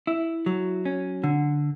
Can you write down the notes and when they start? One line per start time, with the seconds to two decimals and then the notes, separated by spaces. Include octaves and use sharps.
0.07 E4
0.46 F#3
0.85 C#4
1.24 D3